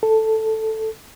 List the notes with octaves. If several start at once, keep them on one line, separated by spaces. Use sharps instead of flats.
A4